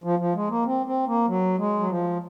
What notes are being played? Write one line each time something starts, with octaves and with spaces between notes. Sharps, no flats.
F3
F3
G#3
A#3
C4
C4
A#3
F#3
G#3
F#3
F3